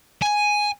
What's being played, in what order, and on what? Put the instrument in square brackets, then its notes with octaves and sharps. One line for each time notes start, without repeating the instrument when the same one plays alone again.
[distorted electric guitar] G#5